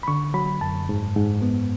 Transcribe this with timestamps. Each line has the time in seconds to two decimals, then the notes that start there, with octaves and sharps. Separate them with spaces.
0.03 B5
0.08 D3 C#6
0.34 F#3 B5
0.61 F#2 A5
0.89 G#2
1.16 G#2
1.42 B3